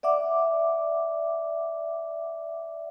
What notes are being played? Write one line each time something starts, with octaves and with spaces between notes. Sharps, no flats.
D5 E5 F#5 D6